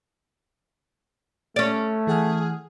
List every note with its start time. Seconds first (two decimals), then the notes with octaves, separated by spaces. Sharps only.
1.56 A3 C#4 D5
2.07 E3 G#4 F#5 F6